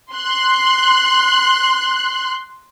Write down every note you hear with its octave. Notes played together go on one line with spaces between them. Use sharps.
C6 F#6